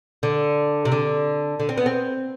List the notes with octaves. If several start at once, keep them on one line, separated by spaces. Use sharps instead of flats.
D3
C3
D3
D3
C4
B3
C4